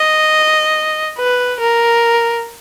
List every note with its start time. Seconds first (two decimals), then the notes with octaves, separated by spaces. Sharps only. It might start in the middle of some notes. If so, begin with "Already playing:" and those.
Already playing: D#5
1.18 B4
1.60 A#4